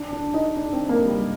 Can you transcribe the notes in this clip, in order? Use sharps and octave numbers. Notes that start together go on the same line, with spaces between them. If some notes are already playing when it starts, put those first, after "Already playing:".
Already playing: D4
D4
D#4
D4
C4
A#3
G3